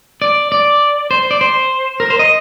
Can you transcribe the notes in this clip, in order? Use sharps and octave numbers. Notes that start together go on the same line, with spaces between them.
D5
D5
C5
D5
C5
A#4
C5
D#5